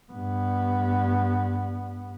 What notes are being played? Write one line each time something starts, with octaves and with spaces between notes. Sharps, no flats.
G2 B3